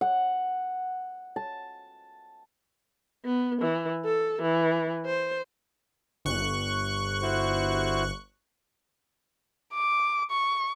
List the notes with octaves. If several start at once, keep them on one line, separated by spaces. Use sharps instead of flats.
F#5
A5
B3
E3
A4
E3
C5
G1 C#6 F#6
E4 F#4 C5
D6
C#6